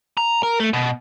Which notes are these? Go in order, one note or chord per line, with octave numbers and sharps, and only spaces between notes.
A#5
A#4
A3
B2